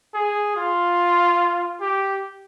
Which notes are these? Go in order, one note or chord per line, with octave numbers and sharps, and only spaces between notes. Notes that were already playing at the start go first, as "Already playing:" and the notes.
G#4
F4
G4